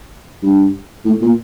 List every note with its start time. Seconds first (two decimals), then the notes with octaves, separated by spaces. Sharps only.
0.43 G2
1.05 A2
1.22 A#2